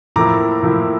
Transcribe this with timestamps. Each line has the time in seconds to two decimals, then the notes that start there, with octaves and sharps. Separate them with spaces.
0.16 A2 F3 A#3 E4 A#5 D6
0.63 A2 F3 A#3 E4